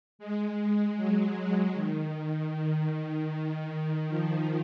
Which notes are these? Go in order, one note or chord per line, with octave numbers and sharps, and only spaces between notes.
G#3
F#3
D#3
D#3
D#3
F3